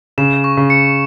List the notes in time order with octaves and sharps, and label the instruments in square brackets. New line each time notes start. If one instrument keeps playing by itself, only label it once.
[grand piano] C#3 [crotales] E7
[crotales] C#6
[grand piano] C#3
[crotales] C#7